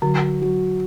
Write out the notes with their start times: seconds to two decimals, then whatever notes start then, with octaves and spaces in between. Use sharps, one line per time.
0.02 D3 F#3
0.42 F#3